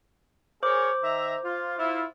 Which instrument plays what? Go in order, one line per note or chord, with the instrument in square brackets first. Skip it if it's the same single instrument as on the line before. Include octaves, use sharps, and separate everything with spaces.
[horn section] G#4 A#4 C#5 [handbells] C5 D6
[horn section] D#3 E5 A#5
F4
E4 F4